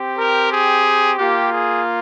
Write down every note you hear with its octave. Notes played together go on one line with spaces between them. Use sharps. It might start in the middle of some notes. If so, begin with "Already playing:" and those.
Already playing: C4 G4
A#4
G#4
A#3 F4 G4
G#4